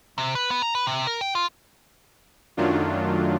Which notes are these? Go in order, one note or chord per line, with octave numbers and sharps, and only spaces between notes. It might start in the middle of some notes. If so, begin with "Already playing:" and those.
C3
B4
B3
A#5
B4
C3
A#4
G5
F4
F#2 D#3 F#3 A3 D4 F4